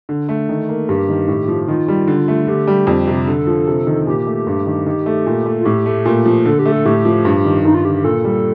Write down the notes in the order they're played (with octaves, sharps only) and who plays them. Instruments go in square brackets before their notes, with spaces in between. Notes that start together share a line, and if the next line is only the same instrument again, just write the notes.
[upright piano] D3
A3
D#3
A#3
[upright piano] G2 [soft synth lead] G4
[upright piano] D#3
A2
F3
[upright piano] D#3 [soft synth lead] F4
[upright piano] G3
D3
A3
[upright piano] D3 [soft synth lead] G4
[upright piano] G3
F2
C3
[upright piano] D3 [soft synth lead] A4
[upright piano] F3
C3
D#3
[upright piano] A#2 [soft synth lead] G4
[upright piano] A3
G2
D#3
D#3
A3
A#2
A3
[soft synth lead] F4
[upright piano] A2 [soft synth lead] G4
[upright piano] A3
A#2
F3
[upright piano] D3 [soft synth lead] A4
[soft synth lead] G4
[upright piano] A3
[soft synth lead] A4
[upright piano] A2 [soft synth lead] G4
[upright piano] F3
G2
D#3
[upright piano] G2 [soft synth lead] D#4
[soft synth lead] F4
[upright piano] D3 [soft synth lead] G4
[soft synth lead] G4
[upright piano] A#2 [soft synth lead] A4
[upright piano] G3